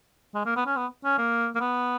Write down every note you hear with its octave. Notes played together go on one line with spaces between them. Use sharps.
G#3
A#3
B3
C#4
B3
C#4
A#3
A#3
B3